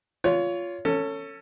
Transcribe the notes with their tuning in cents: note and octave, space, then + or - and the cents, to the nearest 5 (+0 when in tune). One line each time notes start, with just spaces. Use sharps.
F4 +0 C#5 +25
C#4 +0 A4 +25